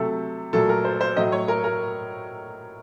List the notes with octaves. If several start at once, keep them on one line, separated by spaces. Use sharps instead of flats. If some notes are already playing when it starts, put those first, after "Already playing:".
Already playing: C3 F#3 A3 A4
A#2 F#3 A3 A4
A#4
C5
C5
A2 F#3 A3 D#5
C#5
A#4
A#4